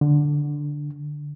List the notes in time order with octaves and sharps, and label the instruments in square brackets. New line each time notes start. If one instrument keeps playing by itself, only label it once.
[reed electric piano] D3